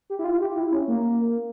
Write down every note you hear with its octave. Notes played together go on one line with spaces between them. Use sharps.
G4
E4
F4
G4
E4
C#4
A#3